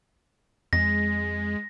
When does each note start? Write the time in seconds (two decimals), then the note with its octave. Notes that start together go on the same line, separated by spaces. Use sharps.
0.73 F2 G#3 A#6